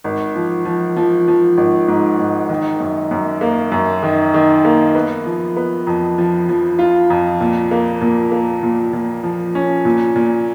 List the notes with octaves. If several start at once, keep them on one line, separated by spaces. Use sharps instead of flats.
G#1
F3
F3
F3
F3
G#1
G#2
G#2
D#3
F#2
F#2
A#3
F#2
D#3
D#3
A#3
B3
F3
B3
F2
F3
F3
F4
F2
A#2
A#3
A#2
A#3
A#2
A#2
F3
C#4
A#2
A#2